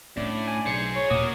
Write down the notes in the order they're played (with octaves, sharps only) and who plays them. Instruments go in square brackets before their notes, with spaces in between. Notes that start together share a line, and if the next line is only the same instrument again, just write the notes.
[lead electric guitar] A2 [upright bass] C#4 D4 [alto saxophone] D5
[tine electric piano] G#5
[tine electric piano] B1 C#7 [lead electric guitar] G#4 C5
[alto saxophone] C#5
[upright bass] D#2 A#2 [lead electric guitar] F#4 A#4 [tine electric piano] D6 D#6